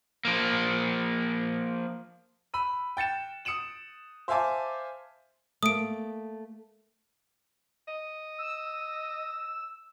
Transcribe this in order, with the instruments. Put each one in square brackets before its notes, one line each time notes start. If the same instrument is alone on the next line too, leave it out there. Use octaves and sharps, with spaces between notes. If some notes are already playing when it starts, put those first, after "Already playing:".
[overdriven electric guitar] F3 A#3
[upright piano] B5 E6 D#7
G5 A6 C#7 E7
D#6 C#7 D7 E7 F#7
C5 E5 F5 G#5 A5 D6
[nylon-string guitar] A3 A#3 [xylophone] D#6 D7
[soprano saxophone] D#5
[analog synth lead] E6